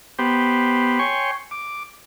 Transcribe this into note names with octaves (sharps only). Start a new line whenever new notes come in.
B3 G4 C5
C#5 G5 G#5 C6 C#6
D6